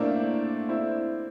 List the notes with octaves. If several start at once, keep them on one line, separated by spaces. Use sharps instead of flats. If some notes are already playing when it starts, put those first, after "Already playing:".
Already playing: A3 A#3 C4 D4 E4
C4 E4